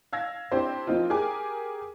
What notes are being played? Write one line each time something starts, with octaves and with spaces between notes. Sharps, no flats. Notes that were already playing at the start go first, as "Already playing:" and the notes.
F5 E6 G#6 A#6
C4 D4 E4 G4 C5
F3 A#3 C4 D#4 F4
G4 G#4 A#4 G#5 D6